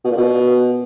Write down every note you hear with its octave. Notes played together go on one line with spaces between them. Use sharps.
B2
A#2
B2